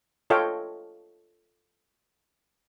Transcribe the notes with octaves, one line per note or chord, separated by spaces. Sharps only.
F4 A4 C#5 D#5 F5 G5